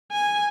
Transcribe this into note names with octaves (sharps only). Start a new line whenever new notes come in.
G#5